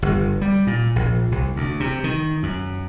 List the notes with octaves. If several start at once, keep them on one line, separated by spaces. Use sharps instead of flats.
G1
G3
A#2
A#1
C2
D2
C3
D#3
F#2